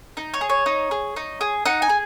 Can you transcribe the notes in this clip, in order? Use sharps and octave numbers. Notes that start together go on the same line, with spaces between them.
D#4
C#5
G#4
C#5
D#4
G#4
D#4
G#4
D#4 F#5
G#5
G#4